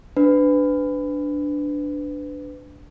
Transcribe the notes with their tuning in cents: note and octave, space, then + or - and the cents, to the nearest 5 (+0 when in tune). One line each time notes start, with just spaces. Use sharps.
D4 +0 B4 +25